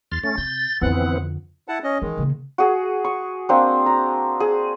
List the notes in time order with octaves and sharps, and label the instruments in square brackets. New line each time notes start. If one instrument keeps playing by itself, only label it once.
[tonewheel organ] E2 C6 F6 [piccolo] A6
[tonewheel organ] A3 C#4 [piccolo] A6
[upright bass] C3 [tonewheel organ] G6
[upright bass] F2 D3 [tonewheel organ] E3 B3 C4 [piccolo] F#5
[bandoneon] E4 F#5 A5
C#4 D#5
[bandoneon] D#3 G#3 [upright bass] E3
[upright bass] C#3 A#3
[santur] F#4 G#4
C#6
A#3 C4 D4
A#5
G#4